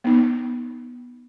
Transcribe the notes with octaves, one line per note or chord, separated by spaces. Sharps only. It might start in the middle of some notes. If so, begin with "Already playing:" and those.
B3 D#4